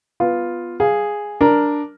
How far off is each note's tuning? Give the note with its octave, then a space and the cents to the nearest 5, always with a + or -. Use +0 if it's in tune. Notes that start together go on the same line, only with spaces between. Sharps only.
B3 +0 F4 +0
G#4 -5 F5 +0
D4 +0 A#4 +0